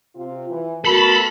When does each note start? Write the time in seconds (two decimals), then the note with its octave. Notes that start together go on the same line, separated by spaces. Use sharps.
0.16 C3 C4 F4
0.49 E3
0.85 A3 B3 F#4 A4 A#4 B5